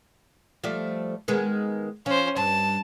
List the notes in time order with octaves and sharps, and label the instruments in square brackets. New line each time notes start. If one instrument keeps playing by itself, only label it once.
[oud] F3 G3 A3
D#3 G#3 B3
[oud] F3 [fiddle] C#4 C5
[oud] G2 [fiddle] A5